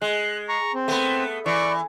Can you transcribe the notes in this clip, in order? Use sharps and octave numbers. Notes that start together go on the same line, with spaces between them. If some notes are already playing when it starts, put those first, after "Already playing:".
G#3 F#6
A#5 C#6
C4
A3 B3
E3 D5 C#6